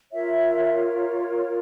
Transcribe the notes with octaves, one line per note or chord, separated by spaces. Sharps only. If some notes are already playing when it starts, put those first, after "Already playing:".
F4 A#4 C#5 E5